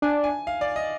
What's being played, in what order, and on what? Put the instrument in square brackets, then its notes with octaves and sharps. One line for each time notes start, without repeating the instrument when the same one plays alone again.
[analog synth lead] D4 [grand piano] G#5
[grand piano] G#5
F5
D5
D#5